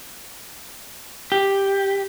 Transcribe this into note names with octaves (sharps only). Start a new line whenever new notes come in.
G4